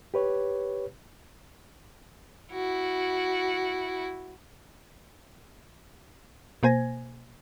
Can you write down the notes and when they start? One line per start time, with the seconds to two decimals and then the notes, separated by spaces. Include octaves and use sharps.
0.14 G4 B4 C#5
2.52 E4 F#4
6.63 B2 A#3 C5 G#5 G#6 A#6